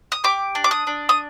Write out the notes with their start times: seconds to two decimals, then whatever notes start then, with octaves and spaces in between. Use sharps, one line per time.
0.12 D#6
0.24 G4 D6
0.55 D4
0.64 D6
0.71 D#6
0.87 D4
1.09 D#6